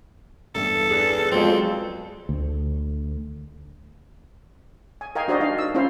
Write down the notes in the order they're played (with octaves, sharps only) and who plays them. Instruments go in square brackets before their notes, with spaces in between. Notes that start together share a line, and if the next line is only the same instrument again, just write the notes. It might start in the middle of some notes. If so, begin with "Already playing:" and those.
[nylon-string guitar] E2 G2 A5 [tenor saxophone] A4
[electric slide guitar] G#4 B4 D5
[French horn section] F2 [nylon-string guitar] F#3 G#3 [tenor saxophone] C4
[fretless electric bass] D2
[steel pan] G#5
A#4 D#5 F5 G5 G#5
D4 F#4 A#4 C5 D5 D#5
D4 D#4 F5
E6
C#4 E4 F4 C5 F5